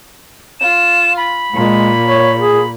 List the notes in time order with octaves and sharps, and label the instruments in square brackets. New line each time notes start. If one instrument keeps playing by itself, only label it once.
[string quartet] F4 [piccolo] E7
[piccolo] B5
[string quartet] A#2 [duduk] G#3
[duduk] C#5
G#4